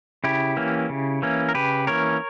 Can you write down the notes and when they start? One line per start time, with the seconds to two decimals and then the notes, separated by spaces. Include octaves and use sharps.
0.24 C#3 E4 G4
0.57 E3 A#3 C#4
0.89 C#3
1.22 E3 A#3 C#4
1.49 A#4
1.54 C#3 G4 B4
1.87 E3 A#3 C#4 A#4 C#5